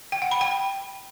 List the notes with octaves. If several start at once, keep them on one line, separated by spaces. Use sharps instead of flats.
G5
F#5
B5
G5